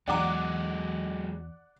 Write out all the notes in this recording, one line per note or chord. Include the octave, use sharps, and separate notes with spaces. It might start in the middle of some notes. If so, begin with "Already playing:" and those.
E2 F#3 G#3 D5 F#5 G5 A#5 D6